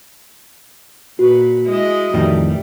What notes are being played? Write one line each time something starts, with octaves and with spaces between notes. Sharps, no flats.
A#2 F#4 B4
G#3 E4 D#5
F2 A2 D#3 E3 G3